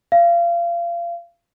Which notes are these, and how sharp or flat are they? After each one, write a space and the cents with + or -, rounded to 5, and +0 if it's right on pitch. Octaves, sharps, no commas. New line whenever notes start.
F5 -30